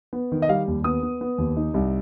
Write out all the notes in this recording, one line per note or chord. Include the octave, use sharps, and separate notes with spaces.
B3
D#3
D#5
G3 F5
D#2
B3 D#6
B3
B3
D#2
D#4
C2